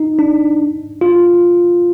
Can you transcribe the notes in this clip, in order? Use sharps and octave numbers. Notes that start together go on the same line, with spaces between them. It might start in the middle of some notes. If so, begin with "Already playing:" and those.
Already playing: D#4
D4
F4